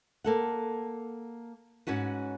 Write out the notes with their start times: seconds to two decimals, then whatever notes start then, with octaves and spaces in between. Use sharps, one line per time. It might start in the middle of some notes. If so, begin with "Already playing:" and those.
0.24 A#3 A4 F#5
1.87 G#2 C#4 F#4 B4